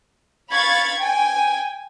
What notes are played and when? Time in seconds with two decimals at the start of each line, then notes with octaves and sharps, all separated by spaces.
0.51 F5 B5 C#6 G#6 A6
0.98 G5 G#5